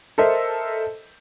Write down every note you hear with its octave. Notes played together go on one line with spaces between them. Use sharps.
A4 A#4 C5 D#5 E5